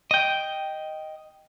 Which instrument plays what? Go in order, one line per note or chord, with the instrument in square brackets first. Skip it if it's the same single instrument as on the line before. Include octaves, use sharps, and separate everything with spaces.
[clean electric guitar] D#5 G5